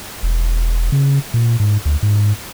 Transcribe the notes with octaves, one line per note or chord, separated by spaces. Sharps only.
E1
C#3
A#2
G#2
D2
G#2